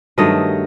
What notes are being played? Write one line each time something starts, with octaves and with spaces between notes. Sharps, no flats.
G2 D#3 F#3 A3 D#5